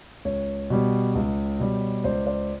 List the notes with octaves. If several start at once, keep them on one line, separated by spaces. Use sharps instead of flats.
C#2 C#5
B2 G3
C#2
B2 G3
C#2 C5 D5
C5 D5